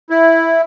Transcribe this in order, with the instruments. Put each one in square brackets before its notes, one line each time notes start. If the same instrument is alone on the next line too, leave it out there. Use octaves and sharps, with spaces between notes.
[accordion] E4